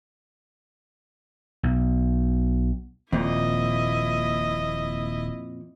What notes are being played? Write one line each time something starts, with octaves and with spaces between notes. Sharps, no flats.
B1
D#1 F2 A#2 E4 D#5